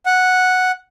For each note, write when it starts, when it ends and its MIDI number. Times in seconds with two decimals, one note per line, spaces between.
0.06 0.71 78